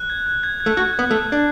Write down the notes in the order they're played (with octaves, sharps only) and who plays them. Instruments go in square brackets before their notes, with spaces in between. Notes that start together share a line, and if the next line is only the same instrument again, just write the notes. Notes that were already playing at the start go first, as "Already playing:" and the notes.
Already playing: [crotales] F#6
G#6
G#6
G#6
G#6
[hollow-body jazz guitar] A3
[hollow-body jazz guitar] F#4 [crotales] F#6
[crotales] F#6
[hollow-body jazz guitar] B3
[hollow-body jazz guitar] A3 [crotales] F#6
[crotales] F#6
[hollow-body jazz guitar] D4